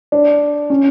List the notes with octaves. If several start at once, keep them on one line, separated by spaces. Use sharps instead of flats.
D4
C#4